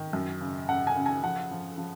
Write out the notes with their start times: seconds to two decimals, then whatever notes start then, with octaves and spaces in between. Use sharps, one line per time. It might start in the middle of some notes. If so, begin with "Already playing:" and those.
Already playing: D#3
0.13 F#2
0.41 C#3
0.69 C#3 F#5
0.87 G#5
0.96 C#3
1.06 G#5
1.23 F3 F#5
1.51 F3
1.78 F3